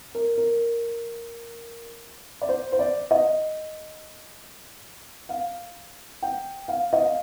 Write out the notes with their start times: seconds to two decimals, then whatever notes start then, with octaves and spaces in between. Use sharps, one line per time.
0.15 A#4
0.38 A#4
2.42 D5
2.49 C5
2.72 C5
2.79 D5
3.11 D#5
5.29 F5
6.22 G5
6.68 F5
6.93 D#5
7.04 F5